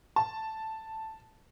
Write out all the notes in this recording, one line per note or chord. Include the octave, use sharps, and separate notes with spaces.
A5